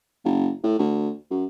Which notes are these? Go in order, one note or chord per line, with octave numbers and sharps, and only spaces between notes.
F#1
A2
D2
F#2